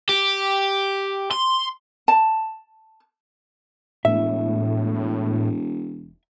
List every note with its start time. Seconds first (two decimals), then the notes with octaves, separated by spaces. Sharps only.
0.09 G4
1.31 C6
2.08 A5
4.05 E1 A2 E5